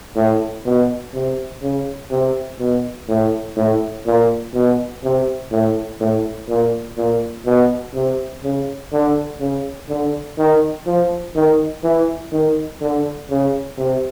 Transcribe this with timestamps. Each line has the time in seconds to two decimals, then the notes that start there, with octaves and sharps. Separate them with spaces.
0.16 A2
0.66 B2
1.14 C3
1.63 C#3
2.11 C3
2.60 B2
3.09 A2
3.57 A2
4.06 A#2
4.54 B2
5.04 C3
5.52 A2
6.01 A2
6.49 A#2
6.97 A#2
7.46 B2
7.95 C3
8.43 C#3
8.92 D3
9.40 C#3
9.89 D3
10.38 D#3
10.87 F3
11.36 D#3
11.84 E3
12.32 D#3
12.81 D3
13.30 C#3
13.78 C3